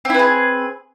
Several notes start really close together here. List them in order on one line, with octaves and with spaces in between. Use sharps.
C4 E4 B4 G#4